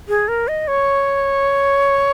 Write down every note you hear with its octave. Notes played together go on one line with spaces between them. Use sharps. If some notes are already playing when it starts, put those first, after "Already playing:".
G#4
A#4
D#5
C#5